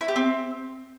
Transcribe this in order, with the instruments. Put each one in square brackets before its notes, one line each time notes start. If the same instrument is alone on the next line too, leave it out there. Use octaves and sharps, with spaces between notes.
[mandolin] E4
G4
C4